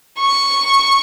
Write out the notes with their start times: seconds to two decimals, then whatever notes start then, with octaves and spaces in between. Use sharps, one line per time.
0.19 C#6